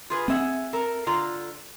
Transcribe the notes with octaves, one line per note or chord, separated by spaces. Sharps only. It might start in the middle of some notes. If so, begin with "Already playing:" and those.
F4 G#4 B4
C4 G#4 E5 F#5
A4 A#4
D3 F4 A#5